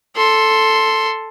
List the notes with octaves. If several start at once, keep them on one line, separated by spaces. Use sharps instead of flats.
A4 C6